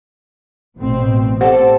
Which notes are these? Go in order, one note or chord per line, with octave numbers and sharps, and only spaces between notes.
A1 B2 C4
C4 G4 A4 C5 D5 F#5